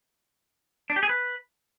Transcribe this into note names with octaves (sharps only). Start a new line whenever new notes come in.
D4
G4
G#4
B4